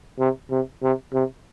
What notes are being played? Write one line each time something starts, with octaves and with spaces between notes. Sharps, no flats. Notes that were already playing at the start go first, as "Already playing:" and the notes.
C3
C3
C3
C3